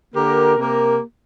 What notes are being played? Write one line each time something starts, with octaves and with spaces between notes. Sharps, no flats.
D3 A#3 G4 A#4
C3 A#3 G4 A#4